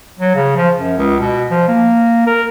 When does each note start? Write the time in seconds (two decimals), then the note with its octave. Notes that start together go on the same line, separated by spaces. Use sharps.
0.19 F#3
0.35 C#3
0.56 F3
0.79 F#2
0.98 C#2
1.20 B2
1.51 F3
1.68 A#3
2.27 A#4